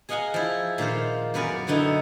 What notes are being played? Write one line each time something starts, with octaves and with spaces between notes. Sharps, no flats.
G#4 D#5 F5 F#5 G#5 A#5
F3 E4
A#2 D#3 F4 C5
F#2 B3 A#4 B4 D5 G#5
B2 D3 B3 D#4 E4